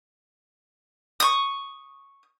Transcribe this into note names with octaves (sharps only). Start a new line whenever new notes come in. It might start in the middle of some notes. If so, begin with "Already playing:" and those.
C#6 D#6